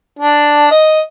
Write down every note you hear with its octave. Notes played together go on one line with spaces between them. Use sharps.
D4
D#5